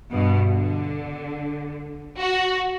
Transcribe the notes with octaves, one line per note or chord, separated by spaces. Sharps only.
G2 B2
D3
F#4